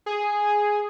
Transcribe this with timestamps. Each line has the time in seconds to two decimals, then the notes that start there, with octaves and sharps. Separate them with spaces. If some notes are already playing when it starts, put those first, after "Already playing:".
0.06 G#4